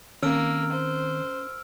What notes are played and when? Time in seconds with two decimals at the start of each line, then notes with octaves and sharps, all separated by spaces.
0.23 D#3 A#3 C4 C#4 E6 F6 D7
0.72 C5